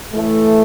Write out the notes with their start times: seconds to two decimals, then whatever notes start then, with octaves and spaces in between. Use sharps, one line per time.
0.13 A2 E3 A3